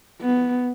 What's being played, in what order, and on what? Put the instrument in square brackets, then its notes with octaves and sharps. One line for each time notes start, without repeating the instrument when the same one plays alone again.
[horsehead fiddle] B3